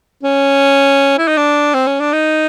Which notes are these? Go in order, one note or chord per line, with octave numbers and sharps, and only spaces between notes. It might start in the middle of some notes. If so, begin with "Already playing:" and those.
C#4
E4
D#4
D4
C4
C#4
D4
D#4